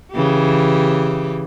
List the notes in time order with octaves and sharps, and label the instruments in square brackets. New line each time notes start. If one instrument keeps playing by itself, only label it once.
[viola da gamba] C#3 E3 G4